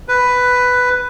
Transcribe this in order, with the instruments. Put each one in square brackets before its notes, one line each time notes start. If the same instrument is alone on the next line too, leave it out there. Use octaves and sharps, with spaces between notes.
[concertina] B4